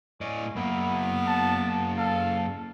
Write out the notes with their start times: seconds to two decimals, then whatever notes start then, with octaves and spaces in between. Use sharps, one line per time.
0.21 A2 C#4 D5 D#5
0.56 F#2 A#3 B3 E4
1.28 A5
1.98 A4 F5